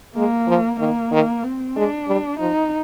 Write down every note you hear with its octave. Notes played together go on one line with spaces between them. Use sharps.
G#3 A#3
F3
D#3 A#3
D#3
C4
G#3 D4
G3
F3 D#4